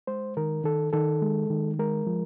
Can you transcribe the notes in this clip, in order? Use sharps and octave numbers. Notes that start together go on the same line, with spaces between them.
G#3 C5
D#3 A#4
D#3 A4
D#3 A4
G#3
D#3
G#3 A#4
F3